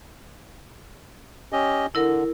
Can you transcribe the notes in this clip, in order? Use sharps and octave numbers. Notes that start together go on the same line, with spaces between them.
C#4 G4 D#5
D3 E4 A#4